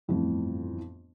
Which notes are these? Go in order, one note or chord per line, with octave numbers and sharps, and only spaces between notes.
G1 F2 A2 E3 F3